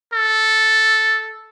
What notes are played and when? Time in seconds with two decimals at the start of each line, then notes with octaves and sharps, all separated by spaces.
0.13 A4